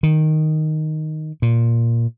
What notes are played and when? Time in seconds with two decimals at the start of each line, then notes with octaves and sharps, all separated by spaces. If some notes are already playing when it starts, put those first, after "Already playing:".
0.03 D#3
1.42 A#2